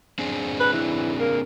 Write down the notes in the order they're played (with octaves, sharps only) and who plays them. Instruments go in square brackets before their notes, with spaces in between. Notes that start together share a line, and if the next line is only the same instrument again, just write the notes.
[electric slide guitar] C4 D4 G#4
[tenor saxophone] B4
E3
A#3